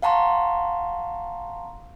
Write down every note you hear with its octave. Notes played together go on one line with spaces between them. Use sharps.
F5 F#5 A5 A#5 C6 C#6